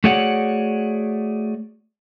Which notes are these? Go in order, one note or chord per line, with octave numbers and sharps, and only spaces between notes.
A3 F#4 G#4 C#5 D5 F#5